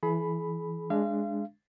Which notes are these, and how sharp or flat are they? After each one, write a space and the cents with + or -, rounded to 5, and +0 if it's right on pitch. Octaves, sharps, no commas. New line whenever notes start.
E3 +10 G#4 +40 B5 +0
G#3 +0 D4 +0 F5 -35